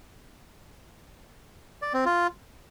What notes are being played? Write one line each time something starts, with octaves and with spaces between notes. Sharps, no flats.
D5
C4
F4